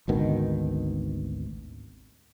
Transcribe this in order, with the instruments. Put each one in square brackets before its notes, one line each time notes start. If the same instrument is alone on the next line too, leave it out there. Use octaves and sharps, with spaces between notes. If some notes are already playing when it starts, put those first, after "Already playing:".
[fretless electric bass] G#1 D2 B2 D#3